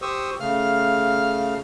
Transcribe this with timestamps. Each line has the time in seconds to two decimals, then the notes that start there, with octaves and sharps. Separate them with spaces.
0.02 G4 C5 C#6 D#6 E6
0.40 C#3 A3 F5 F6